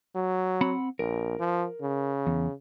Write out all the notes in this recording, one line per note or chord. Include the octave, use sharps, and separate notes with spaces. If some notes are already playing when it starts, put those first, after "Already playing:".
F#3
C4 F#5 B5
A#1 A#4
F3
C#3
E2